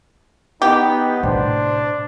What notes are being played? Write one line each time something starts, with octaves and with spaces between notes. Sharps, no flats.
B3 D#4 G4
A2 C3 D4 C5